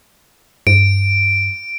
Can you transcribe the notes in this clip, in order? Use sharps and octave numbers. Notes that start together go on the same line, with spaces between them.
G2 D7